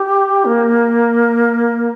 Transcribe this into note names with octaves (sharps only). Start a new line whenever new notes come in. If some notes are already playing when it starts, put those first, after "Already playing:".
Already playing: G4
A#3